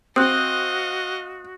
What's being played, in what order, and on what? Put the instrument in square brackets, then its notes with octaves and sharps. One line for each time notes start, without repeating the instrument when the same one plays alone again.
[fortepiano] C4 [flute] F#4 [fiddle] D#5 F5 [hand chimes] D#6 F#6